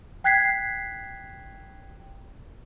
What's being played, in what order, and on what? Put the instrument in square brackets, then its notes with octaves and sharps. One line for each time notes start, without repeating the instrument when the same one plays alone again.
[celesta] G5 F#6 G#6 B6 C7